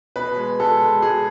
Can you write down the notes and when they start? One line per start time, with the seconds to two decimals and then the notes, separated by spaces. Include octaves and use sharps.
0.16 B2 B4
0.37 G#3
0.60 G#3 A4
0.80 G#3
1.02 G#3 G#4